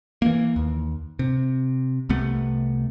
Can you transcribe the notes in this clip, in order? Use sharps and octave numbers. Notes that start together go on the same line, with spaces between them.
E3 A#3
D#2
C3
C2 C3 A3 B3